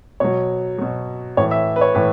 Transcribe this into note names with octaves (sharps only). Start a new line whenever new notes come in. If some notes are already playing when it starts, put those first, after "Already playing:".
B2 F#3 C#5
B2 F#3
A2 E3 C#5
E5
B4
C#5
A2 E3 B4